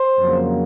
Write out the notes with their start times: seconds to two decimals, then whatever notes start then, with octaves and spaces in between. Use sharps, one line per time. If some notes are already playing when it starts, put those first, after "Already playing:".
Already playing: C5
0.17 F2 C#3 F#3 A#3